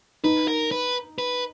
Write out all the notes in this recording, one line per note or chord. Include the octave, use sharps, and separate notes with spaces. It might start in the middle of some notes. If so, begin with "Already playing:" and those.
D#4 B4
A#4
B4
B4